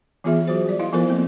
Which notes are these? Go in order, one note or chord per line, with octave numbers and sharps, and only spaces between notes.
E3 B3 F4 G#4 E5
F#3 F#4 C5
G3 D5
E4 D#5 F5
F3 B3 F4 A4 A#4 C5
A#3 C4